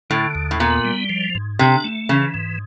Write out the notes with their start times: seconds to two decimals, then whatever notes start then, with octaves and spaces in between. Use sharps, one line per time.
0.10 A2 D3
0.35 D#2
0.51 A2
0.60 A#2 B3
0.85 G3
1.09 F3
1.35 G#2
1.59 C3 D4
1.84 A3
2.09 C#3 E3
2.34 G#2